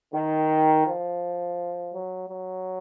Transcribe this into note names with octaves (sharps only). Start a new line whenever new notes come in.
D#3
F3
F#3
F#3